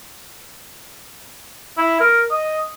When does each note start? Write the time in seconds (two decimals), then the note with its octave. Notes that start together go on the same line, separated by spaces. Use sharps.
1.78 E4
2.00 A#4
2.31 D#5